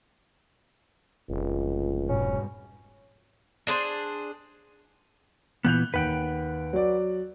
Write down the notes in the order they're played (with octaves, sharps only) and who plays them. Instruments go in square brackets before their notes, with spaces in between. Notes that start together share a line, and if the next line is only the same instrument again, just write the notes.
[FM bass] F1 [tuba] C#2
[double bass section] G#2 B2 G3 [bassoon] C#4
[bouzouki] D4 G#4 B4 C5
[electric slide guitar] A#2 E3 B3 [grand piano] F#6 G6 F7
[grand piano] D#2 [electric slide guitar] B4 F#5 G5
[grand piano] F#3 D5